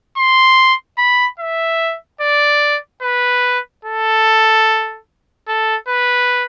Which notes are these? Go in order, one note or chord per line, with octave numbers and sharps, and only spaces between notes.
C6
B5
E5
D5
B4
A4
A4
B4